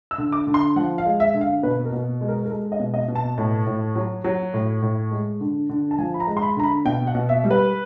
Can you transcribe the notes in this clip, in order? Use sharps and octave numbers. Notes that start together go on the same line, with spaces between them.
E6
D3
D6
D3
C6
F3 F#5
F5
G#3
E5
D3
F5
B2 B4
A#4
B2
G#3
A#4
A#4
G#3 A4
D#5
B2
D#5
B2
A5
A2 A5
A2
F#3
F#3
A2
A2
G#3
D3
D3
A5
F3 G#5
B5
A#5
G#3
C6
B5
D3 A#5
B5
B2 G5
F#5
B2
E5
G3
B4